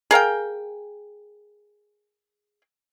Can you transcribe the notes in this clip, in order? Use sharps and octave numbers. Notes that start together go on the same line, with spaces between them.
G#4 A#4 F5 G5